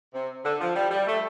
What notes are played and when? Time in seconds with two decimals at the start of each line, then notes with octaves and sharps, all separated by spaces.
0.13 C3
0.45 D3
0.60 F3
0.76 G3
0.91 G3
1.07 A3